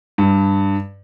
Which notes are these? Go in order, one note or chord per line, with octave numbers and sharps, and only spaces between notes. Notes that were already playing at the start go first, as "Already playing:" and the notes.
G2